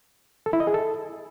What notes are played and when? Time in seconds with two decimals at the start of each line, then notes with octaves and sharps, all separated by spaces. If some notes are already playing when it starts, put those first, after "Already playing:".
0.46 A4
0.53 E4
0.60 D#5
0.67 G#4
0.74 A4